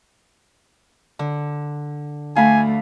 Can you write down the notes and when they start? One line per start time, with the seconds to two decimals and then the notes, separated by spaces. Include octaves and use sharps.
1.19 D3
2.36 D2 A3 D4 F5 G#5 B5